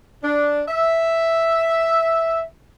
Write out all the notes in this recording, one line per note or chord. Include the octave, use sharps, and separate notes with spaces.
D4
E5